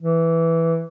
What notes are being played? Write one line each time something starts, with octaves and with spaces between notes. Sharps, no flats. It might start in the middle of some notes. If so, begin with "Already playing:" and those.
E3